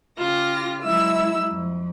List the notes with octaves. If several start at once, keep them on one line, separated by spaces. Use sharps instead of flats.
C#3 F4 G4 A#6
F#3 G#3 E4 E5 E6
F2